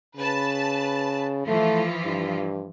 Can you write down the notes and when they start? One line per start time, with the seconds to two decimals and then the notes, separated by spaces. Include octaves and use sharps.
0.17 C#3 B4 A5
1.48 E3 F3 A3 F4
2.05 G2